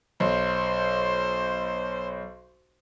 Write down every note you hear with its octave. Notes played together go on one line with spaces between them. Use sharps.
B1 C5